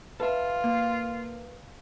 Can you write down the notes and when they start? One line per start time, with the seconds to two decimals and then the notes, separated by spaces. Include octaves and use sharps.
0.20 F4 A4 B4 E5
0.64 A#3